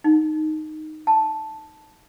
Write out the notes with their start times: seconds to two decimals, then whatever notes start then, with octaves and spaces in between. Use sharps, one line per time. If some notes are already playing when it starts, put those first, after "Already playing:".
0.04 D#4
1.07 A5